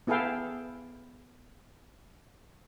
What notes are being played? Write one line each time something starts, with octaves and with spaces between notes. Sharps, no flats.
B3 E4 G#4 A4 F5 G5